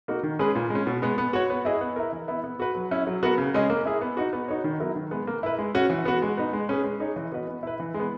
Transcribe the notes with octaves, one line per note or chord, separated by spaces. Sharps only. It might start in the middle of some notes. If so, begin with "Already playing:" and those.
A#3 D#4 F#4
D#3
G#3 C#4 G#4 B4
A#2
G#3 C#4
B2
G#3 B3
B3
F#4 C#5
B3
E4 G#4 D#5
B3
E4 A#4
E3
B3 E4
B3
F#4 B4
F#3
C#4 E4
F#3
B3 F#4 A#4
C#3
G#3 C#4 G#4 D#5
A#3
E4 G#4
B3
D#4 F#4
B3
D#4 F#4 C#5
D#3
F#3 B3 E4 A#4
D#3
G#3 B3
A#3
E4 B4
G#3
C#4 F#4
E3
B3 F#4
G#3
B3 D#4
G#3
C#4 G#4 B4
G#3
D#4 G#4 C#5
E3
B3 F#4 B4 D#5
B3
E4 B4
E3
G#3
B3